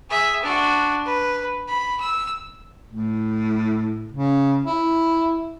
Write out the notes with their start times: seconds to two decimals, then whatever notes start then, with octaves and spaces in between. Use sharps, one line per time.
0.10 G#4 E5
0.42 D4 F#4
1.05 B4
1.68 B5
2.00 E6
2.88 A2
4.12 C#3
4.65 E4